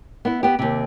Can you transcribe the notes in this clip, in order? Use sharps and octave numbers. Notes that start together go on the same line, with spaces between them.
B3 E4
B3 G4
D#2 C3